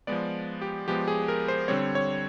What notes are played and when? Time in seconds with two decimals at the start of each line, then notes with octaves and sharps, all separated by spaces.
0.07 F3 G#3 B3 D5
0.62 G4
0.88 F3 G#3 B3 G4
1.08 G#4
1.28 A#4
1.48 C5
1.68 D3 G3 C4 C#5
1.95 C#5